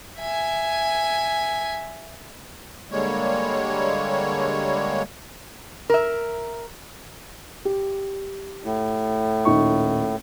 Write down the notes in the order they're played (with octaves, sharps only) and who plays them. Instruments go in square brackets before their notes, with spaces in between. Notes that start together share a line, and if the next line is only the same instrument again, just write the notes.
[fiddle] E5 G#5
[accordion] D3 G3 G#3 A#3 C#5
[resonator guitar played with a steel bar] A#4 E5
[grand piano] G4
[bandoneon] A2
[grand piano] D#1 D#4 C#6